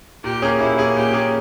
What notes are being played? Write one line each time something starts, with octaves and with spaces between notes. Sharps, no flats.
A#2 G4
A#3 C#4 G#4
A#2 E4
A#3 C#4 G#4
A#2 G4
A#3 C#4 G#4